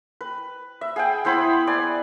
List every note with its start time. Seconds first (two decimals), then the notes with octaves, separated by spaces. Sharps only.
0.21 B4
0.81 E5
0.96 G#4 F#5 G5
1.25 B3 E4 C5 B5
1.67 B4 D5 G#5